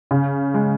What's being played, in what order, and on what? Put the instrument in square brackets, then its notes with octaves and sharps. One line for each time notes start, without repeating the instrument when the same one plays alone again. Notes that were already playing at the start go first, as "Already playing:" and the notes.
[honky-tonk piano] C#3
G#3